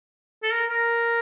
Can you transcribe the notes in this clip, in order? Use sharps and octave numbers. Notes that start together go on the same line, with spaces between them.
A4
A#4
A#4